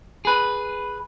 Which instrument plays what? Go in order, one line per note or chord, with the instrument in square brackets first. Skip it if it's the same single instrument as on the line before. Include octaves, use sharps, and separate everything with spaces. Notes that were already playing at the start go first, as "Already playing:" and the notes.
[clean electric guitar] G#4 B4